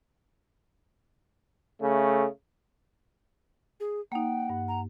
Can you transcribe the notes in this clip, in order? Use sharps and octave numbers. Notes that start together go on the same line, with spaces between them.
C#3 A3
G#4
A#3 D#4 F#5 G5
G2
A#5